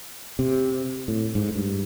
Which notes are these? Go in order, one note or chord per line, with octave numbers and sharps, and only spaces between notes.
C3
A2
G#2
G2